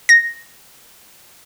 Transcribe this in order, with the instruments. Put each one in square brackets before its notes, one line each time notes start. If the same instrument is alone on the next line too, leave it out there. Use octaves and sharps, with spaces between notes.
[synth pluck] A#6